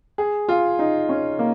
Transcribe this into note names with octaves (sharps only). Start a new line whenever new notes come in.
G#4
F4
D#4
C#4
A#3